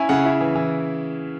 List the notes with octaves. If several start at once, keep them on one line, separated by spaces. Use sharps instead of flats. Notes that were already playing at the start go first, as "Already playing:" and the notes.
Already playing: C#4 E4 G#5
C#3 F#5
E4
E3
E3